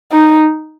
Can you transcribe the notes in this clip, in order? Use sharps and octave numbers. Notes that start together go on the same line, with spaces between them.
D#4